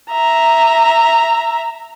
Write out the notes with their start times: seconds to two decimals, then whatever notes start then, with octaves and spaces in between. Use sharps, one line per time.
0.11 E5 A#5